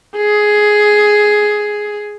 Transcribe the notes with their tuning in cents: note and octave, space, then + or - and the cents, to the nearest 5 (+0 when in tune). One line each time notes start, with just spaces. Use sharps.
G#4 +10